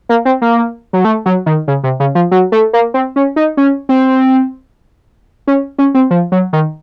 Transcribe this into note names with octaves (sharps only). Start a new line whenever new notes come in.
A#3
C4
A#3
F#3
A3
F#3
D#3
C#3
C3
C#3
F3
F#3
A3
A#3
C4
C#4
D#4
C#4
C4
C#4
C#4
C4
F3
F#3
D#3